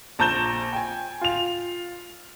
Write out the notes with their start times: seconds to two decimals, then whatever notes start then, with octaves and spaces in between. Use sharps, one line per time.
0.19 A#1 A5 A#5 G6 E7 G7
0.73 G5 G#5
1.21 F4 F7